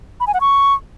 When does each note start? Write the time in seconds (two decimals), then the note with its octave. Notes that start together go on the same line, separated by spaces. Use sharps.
0.20 B5
0.27 G#5
0.34 F#5
0.41 C#6